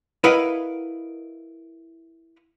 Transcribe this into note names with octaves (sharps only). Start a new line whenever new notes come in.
E4 A#4 B4 D#5 F5 F#5